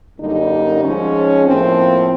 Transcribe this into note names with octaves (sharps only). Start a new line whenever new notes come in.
F#2 D3 G3 A#3 D#4
G#2 F3 G#3 C#4
A2 F3 A#3 C4